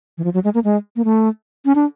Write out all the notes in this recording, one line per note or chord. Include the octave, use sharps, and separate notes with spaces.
E3
F3
F#3
G#3
A#3
G#3
A#3
A3
C#4
D4